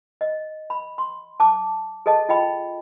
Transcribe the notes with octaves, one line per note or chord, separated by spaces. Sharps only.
D#5
B5
C6
A5 D6
G#4 A4 D#5 A5
F4 D#5 G5 B5